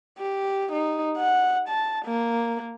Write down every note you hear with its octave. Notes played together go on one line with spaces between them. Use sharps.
G4
D#4
F#5
A5
A#3